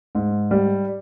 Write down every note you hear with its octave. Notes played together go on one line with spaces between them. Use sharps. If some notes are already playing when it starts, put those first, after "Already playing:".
G#2
G3